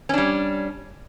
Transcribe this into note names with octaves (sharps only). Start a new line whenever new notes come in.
G3 C#4 D4